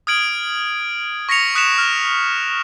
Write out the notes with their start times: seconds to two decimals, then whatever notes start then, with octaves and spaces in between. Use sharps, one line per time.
0.07 D#6 F6 G#6 D7 F#7
1.29 C#6 A#6 B6 C#7 F7
1.55 D#6 F#6 B6 C#7 E7 F7
1.78 F6